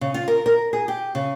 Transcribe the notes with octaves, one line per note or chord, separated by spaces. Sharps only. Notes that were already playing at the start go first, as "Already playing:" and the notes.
C#3
F4
A#4
A#4
G#4
G4
C#3